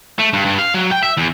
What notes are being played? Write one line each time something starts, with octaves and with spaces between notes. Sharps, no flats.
A3
G2
G2
F5
F#3
G5
E5
E2